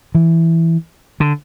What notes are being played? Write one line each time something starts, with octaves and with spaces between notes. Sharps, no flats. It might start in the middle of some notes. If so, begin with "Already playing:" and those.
E3
D3